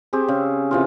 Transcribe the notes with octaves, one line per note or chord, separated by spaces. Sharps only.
C4 G4 G#4
C#3
C3 E3 F4